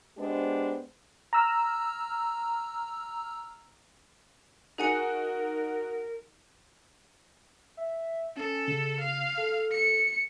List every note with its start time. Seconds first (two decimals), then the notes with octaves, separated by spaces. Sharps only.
0.17 G#3 B3 D4 G4 C5 D#5
1.33 A#5 E6 F6
4.78 D#4 F#4 G#4 A#4 G#5 C#7
7.77 E5
8.37 C#4 A4
8.68 C#3
9.00 F5
9.37 A4
9.71 C#7